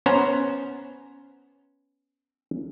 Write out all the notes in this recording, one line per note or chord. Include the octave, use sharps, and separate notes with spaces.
B3 C#4 C5 A#5